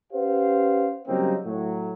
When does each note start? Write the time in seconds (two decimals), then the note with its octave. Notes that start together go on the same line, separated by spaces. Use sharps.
0.13 C#4 G4 B4 C5 F5 F#5
1.08 C#3 F#3 G3 A#3 C4 D#4
1.46 A2 F#3